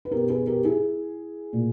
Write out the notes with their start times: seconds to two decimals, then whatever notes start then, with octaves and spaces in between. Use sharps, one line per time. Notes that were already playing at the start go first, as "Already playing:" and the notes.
0.05 B4
0.11 B2 G4 A#4
0.29 G#4 B4
0.47 G4 A#4
0.65 E4 G#4
1.53 A#2